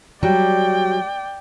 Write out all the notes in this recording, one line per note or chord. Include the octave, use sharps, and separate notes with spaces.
F#3 G3 D5 G5